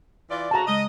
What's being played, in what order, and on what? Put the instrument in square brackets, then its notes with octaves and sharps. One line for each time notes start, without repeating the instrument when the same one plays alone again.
[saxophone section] E3 F4 D5
[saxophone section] D2 C#3 F#4 [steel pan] A5 A#5
[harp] C#3 G#3 [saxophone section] D#5